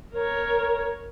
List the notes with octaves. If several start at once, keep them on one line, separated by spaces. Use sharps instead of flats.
A#4 C#5